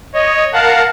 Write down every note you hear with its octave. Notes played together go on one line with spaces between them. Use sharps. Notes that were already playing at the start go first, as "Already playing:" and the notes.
C#5 D#5
A#4 F5 F#5 A5